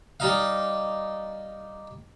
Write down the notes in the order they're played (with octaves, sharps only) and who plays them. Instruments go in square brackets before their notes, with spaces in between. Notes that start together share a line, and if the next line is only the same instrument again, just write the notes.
[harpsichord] G3 D#4 F5